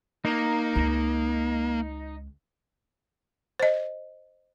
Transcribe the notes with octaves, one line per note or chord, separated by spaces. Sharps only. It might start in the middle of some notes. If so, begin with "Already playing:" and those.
A#3 D#4
C#2
C5 D#5